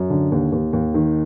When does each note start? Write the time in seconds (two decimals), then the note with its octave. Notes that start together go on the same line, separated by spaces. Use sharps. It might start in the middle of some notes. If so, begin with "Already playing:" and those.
Already playing: F#2
0.10 D3
0.32 D#2
0.52 D#2
0.73 D#2
0.94 D#3